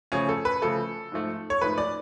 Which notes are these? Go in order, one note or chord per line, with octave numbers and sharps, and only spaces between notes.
C#3 F3 A3 C#4
A4
B4
C#3 F3 A3 A4
G#2 F3 A3
C#5
G#2 F3 A3 B4
D5